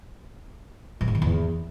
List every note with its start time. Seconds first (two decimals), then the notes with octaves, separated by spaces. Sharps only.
1.01 G2
1.08 G#2
1.15 D#3
1.22 E2